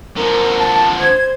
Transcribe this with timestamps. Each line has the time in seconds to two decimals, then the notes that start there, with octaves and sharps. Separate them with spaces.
0.17 D3 F3 A#4
0.57 A5
0.99 C5 G#6